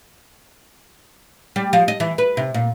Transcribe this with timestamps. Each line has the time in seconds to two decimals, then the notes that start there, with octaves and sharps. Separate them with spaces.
1.56 G3
1.73 F3
1.88 D#5
2.00 E3
2.18 B4
2.37 C3
2.54 A#2